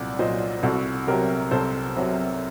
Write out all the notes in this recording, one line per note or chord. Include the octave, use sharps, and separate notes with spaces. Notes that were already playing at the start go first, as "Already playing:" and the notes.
Already playing: C2 A#2 F#3 D5 F#5
A#2 F#3 C5 D#5
C2 F#4 A4
C3 F#3 G4 A#4
C2 A4 C5
C3 F#3